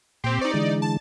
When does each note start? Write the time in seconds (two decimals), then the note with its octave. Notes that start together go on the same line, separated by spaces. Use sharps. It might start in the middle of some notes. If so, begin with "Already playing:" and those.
0.24 A#2 C4 G4 C6
0.41 D#4 C5 D5 C#6
0.54 D3 E3 G#3
0.82 A5